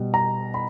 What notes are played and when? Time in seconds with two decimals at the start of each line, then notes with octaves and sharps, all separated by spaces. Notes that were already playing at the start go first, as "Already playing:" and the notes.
Already playing: B2 G3 B3
0.14 A#5
0.54 B5